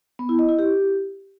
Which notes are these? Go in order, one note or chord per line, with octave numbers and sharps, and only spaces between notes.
B3
E4
D#5
E4
G4